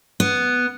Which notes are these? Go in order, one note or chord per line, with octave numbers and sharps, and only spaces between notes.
B3